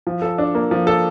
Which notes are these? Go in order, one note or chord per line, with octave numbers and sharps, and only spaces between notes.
F3
A4
D4
A#3
F3
A4